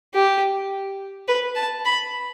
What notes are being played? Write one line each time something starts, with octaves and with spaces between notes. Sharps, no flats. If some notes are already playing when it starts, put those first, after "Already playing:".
G4
B4
A5
B5